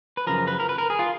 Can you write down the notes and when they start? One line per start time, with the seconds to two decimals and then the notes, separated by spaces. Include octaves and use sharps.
0.17 B4
0.27 F#2 C#3 F3 A#4
0.48 B4
0.60 A#4
0.69 B4
0.78 A#4
0.90 G#4
0.99 F4